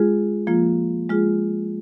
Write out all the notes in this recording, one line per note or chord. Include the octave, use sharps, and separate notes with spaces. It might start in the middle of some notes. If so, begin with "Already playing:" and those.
Already playing: G#3 F4 G#4
F3 A#3 F4
G#3 F4 G#4